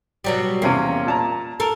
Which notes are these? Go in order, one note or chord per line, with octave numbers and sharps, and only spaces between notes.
B2 F#3 G3
E2 C3 A#3 C#4
A#2 A5 A#5
A4 A#4